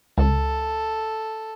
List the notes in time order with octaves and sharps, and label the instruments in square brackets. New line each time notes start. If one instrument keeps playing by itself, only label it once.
[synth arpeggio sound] C#2 [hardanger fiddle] A4